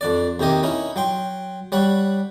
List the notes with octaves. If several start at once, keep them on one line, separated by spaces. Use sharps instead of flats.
F2 D4 D5
D#2 C3 A#3 G4 D#5
C#4 D#4 E4
F#3 G5 C6
G3 C#5 F#5 B5